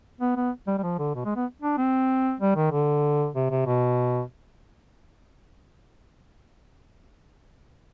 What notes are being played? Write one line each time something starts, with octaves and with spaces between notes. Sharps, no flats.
B3
B3
G3
G3
F3
D3
B2
G#3
B3
D4
C4
G3
D#3
D3
C3
C3
B2